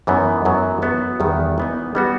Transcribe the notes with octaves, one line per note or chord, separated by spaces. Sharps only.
F#2 E3 B3 D#4
F#2 F#3 B3
F#3 B3 F#4 A4
E2 D#3 G3
E3 B3 D#4
G3 B3 F#4